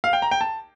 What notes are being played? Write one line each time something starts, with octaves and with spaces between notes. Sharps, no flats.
F5
G5
A#5
G5
A5